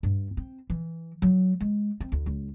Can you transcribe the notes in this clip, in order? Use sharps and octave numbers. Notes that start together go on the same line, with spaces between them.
G2
C4
E3
F#3
G#3
C4
D2
C#2